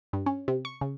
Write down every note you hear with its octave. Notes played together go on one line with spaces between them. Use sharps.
G2
C#4
C3
C#6
C#3